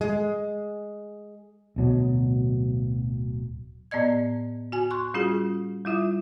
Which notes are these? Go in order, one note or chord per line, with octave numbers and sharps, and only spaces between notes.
G#3
D1 B2 F#3
A2 B3 D5 D#5 G#6
F#4 G#5
C6 C#6 F#6
G3 C#4 F4 F#4 G#4
G3 E4 F4 E5